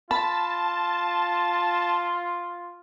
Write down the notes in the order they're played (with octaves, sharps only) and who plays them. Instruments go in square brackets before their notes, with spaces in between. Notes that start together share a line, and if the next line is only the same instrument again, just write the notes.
[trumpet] F4 [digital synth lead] A5 [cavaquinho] B5